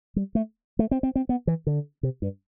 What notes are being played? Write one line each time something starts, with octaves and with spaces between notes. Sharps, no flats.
G3
A3
A3
C4
C4
C4
B3
E3
D3
C3
G2